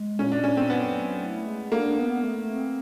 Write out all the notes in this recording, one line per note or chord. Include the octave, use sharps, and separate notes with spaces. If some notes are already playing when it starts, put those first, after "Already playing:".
Already playing: G#3
A#2 C#4
D4
A#2 C#4
C4
F#3 B3
A3
E4
G#3
A#3 D4
B3
A3
C4